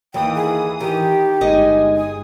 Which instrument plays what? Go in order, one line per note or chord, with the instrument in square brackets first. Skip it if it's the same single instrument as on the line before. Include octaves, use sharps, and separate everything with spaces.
[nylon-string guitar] D#2 [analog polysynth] E3 D#6 [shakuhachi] G5
[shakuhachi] G#4
[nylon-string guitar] D#3 [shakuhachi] G4
[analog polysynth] G1 G#3 G#5 [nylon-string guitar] D#4 D#5
[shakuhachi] D#6